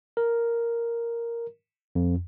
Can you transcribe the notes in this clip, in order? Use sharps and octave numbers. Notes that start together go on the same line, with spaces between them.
A#4
F2